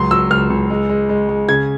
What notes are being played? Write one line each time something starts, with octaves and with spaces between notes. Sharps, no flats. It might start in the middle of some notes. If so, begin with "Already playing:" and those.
Already playing: C#2 F#3 C6
F#3 E6
C#2 F6
C#2
G#3
G#3
G#3
G#3
C#3 G#6